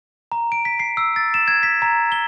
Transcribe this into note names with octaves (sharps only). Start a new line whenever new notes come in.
A#5
D7
B6
C7
E6
A6
E7
G#6
B6
A#5
G7